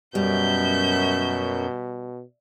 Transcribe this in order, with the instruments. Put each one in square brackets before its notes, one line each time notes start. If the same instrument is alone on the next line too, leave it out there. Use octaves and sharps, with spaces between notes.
[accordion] F#2 [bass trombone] B2 [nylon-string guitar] G3 [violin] E5 G6